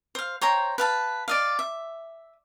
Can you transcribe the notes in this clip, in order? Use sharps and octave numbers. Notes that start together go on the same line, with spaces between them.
C5 F5
C5 C#5 G5 A#5
B4 F5 A5
D5 D#5 F5
E5